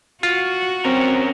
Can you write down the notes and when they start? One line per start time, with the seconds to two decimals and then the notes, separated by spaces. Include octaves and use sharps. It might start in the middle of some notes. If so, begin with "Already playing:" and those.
0.23 F4 F#4
0.85 C4 C#4 A#4